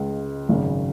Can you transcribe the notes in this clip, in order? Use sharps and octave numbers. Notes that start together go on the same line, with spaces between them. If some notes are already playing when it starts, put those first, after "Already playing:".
Already playing: C#2 C#3 G#3
G#1 F#2 C#3